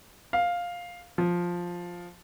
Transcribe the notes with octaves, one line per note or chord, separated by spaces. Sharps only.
F5
F3